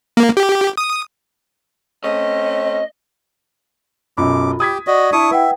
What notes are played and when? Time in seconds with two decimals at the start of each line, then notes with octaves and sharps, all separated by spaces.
0.17 A#3
0.37 G4
0.77 D#6
2.04 A3 C4 C#4 D#5
4.18 B1 F#2 F4 B5 D6
4.60 G4 D#6 G#6 B6
4.87 F#4 D5 D#5
5.13 D4 E4 C#6 D#6 D#7
5.31 B4 E5 F#5 G5